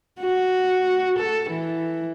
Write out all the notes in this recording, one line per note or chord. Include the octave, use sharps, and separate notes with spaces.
F#4
A4
E3